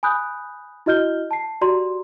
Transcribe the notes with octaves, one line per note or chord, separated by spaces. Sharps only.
G#5 B5 D#6 F#6 G6
E4 F#4 D#5 F6 G6 G7
A5 C7
F#4 G4 D5 A#5 C6